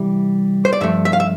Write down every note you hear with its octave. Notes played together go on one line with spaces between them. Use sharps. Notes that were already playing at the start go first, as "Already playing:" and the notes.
Already playing: C3 E3 G3
C5
D5
G2 F3 A3 E5
E5
F5
E5